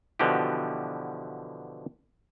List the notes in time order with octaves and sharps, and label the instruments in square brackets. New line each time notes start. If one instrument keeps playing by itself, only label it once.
[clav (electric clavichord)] B2 D3 E3 F3 F#4 G4